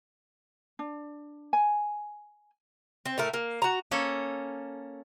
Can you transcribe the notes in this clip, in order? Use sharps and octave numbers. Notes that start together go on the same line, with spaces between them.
D4
G#5
C4
A2 A3 A#4
A#3
F#4 A#5
A#3 C#4 A4